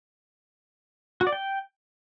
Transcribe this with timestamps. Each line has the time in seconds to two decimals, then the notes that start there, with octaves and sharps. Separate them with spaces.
1.21 F#4
1.27 D5
1.33 G5